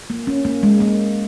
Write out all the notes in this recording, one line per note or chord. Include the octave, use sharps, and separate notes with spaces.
A#3
C#4
A#3
G#3
A#3